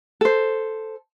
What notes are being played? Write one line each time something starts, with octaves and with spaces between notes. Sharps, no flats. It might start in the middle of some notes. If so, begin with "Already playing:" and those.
A4 C5